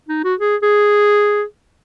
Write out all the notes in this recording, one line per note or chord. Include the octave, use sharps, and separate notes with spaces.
D#4
F#4
G#4
G#4